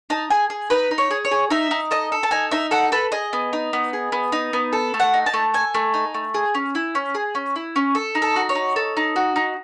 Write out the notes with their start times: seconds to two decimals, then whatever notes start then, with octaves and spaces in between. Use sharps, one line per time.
0.10 D#4 A5
0.30 G#4 G#5
0.50 G#4
0.70 D#4 B4
0.91 D#4
0.98 C#5
1.11 G#4
1.25 C#5
1.31 G#4
1.50 D#4 E5
1.71 D#4
1.91 A4 D#5
2.12 A4
2.23 A5
2.31 D#4 G#5
2.51 D#4 E5
2.71 A4 F#5
2.92 A4 B4
3.12 G#4 D#5
3.33 B3
3.53 D#4
3.73 B3
3.93 G#4
4.12 B3
4.32 D#4
4.53 B3
4.73 A4
4.94 A3
5.00 F#5
5.14 D#4
5.26 A5
5.34 A3
5.54 A4 G#5
5.75 A3
5.94 D#4
6.14 A3
6.34 G#4
6.55 C#4
6.75 E4
6.95 C#4
7.15 G#4
7.35 C#4
7.56 E4
7.76 C#4
7.95 A4
8.15 D#4
8.22 A4
8.36 F#4
8.49 C#5
8.55 D#4
8.76 A4
8.97 D#4
9.16 F#4
9.36 D#4